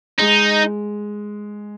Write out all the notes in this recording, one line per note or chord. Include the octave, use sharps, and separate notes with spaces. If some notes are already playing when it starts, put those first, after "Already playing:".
G#3 D#4